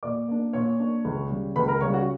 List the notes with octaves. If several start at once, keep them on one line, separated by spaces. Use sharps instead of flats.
A#2 D5 D6
A#3 D4
A#2 C#5 C#6
A#3 D4
C#2
C#3 G3
C#2 B4 B5
A#4 A#5
C#3 G3 C#5 C#6
F#4 F#5